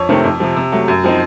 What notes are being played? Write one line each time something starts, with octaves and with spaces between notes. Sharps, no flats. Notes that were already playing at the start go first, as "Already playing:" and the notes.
Already playing: F2 C#5
C3 D#3 A3 C4
F2
C3 F3
C3
F#3 A3
F#2
F3 C4 D#4